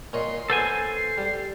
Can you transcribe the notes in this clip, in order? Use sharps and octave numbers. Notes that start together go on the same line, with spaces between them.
A#2 C#5 D#5 C6
B3 A4 C5 G#5 C7
C7
G3